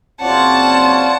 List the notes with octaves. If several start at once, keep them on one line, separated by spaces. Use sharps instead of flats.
F#1 C4 F4 C#5 D5 F#5 A5